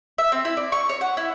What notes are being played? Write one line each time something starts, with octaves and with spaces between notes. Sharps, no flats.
E5
C4
E4
D5
C#6
C#5
F#5
E4